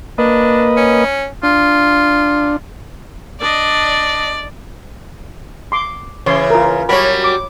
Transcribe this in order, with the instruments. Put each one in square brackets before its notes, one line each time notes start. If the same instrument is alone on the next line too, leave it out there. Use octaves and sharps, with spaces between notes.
[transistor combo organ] A#3 B4 D#5 [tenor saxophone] D4
[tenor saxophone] C#4
[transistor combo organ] D4 [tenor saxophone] F4
[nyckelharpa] D4 D#5 [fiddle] D5
[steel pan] C6 D6
[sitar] C#3 E3 [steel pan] C#5 C6
[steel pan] F4 A#4
[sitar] F#3 G3 A#4 [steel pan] C#5 B5
[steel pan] D6